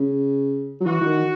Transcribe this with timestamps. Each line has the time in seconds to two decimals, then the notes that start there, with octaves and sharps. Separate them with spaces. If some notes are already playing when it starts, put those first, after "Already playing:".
Already playing: C#3
0.81 F#3
0.86 E3 F#4
1.01 E3
1.05 D#3